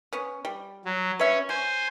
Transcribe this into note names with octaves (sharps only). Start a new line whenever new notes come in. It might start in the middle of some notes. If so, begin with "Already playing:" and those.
B3 C#4
G3
F#3
C#4 B4 C#5 E5
F#3 C5 G#5